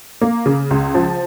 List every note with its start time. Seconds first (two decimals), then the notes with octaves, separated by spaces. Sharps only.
0.21 A#3
0.46 C#3
0.71 C#2
0.94 F3